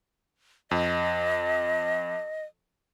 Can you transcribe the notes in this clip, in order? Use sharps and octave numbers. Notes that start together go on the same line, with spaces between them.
F2 D#5